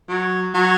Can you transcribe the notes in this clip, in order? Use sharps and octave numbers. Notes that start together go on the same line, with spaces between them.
F#3
F#3